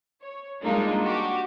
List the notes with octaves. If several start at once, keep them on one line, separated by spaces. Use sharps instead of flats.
C#5
G3 G#3 A#3 D4 D#4 F4
F#4 G4